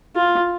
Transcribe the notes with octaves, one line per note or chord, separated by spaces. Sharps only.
F4